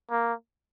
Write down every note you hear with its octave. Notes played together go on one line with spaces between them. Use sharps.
A#3